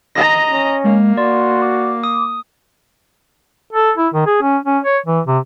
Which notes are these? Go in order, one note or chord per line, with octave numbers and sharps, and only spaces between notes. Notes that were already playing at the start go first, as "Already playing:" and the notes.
D#5 A#5 A#6
C#4
G#3 A#3
F#4 D5 C6
D6
D#6
A4
E4
D#3
G#4
C#4
C#4
C#5
E3
C3